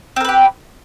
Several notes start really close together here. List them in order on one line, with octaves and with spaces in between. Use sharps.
C4 A#4 B4 G4